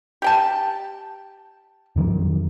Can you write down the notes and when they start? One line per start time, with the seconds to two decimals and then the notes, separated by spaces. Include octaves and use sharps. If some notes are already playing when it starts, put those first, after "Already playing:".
0.22 G4 G5 A5
1.96 F2 D#3 F#3